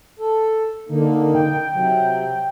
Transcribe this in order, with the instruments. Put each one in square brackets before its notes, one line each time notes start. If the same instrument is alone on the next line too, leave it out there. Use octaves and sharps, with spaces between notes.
[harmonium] A4
[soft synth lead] D3 [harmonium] A#3 D#4
[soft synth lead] G5
[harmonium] C3 F#3